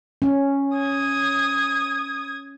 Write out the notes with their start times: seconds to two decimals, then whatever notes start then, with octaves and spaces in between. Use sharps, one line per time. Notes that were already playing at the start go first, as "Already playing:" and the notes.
0.22 C#4
0.77 D#6 G#6